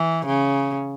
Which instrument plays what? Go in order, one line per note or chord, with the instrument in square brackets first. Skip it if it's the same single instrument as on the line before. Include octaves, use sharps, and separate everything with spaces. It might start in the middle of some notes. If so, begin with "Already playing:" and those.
Already playing: [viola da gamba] E3
C#3